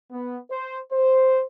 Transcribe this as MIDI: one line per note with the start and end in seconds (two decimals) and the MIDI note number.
0.11 0.37 59
0.51 0.78 72
0.92 1.44 72